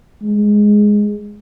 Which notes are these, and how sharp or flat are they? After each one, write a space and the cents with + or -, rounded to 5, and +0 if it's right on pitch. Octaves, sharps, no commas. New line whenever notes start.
G#3 +0